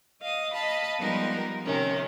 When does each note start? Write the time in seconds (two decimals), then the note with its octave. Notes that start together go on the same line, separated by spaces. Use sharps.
0.21 D#5 F5 D#6
0.53 D#5 F5 A5 B5
0.98 F3 G3 G#3 B3 D#4 A#4
1.64 C3 D#3 C#4 A#4